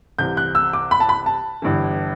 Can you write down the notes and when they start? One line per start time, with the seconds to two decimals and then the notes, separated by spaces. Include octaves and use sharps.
0.19 C2 C3 E3 G6
0.37 F#6
0.55 E6
0.73 D6
0.91 B5
1.00 A5
1.09 B5
1.26 A5
1.62 G1 G2 E3